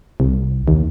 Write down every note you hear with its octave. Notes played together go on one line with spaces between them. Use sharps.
C2
D#2